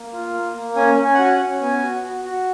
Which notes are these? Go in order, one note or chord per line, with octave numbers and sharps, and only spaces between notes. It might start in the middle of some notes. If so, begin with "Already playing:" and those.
Already playing: A#3
F4
A#3
A#3
C#4 G#5
C#4
G#5
F#5
F#4 G#5
F#5
C#4
B3 G#5
F#4
F#4
F#4